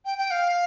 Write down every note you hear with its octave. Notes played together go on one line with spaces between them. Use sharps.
G5
G5
F5